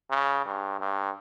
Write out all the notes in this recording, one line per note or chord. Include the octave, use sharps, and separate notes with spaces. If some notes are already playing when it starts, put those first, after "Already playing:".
C#3
G2
G2